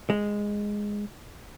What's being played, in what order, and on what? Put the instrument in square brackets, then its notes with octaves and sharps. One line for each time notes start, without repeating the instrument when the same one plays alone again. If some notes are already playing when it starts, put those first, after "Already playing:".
[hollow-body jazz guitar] G#3